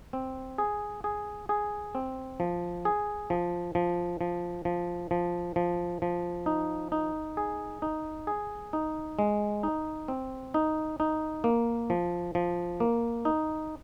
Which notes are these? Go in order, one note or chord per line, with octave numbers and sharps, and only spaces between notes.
C4
G#4
G#4
G#4
C4
F3
G#4
F3
F3
F3
F3
F3
F3
F3
D#4
D#4
G#4
D#4
G#4
D#4
G#3
D#4
C4
D#4
D#4
A#3
F3
F3
A#3
D#4